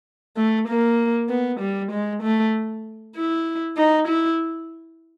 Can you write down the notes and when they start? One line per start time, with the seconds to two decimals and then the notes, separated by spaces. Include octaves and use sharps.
0.37 A3
0.68 A#3
1.30 B3
1.60 G3
1.92 G#3
2.23 A3
3.16 E4
3.77 D#4
4.08 E4